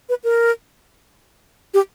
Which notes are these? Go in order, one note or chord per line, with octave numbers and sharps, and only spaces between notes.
B4
A#4
G4